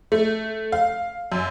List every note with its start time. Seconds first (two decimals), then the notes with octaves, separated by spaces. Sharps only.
0.12 A3
0.72 F5
1.32 F#2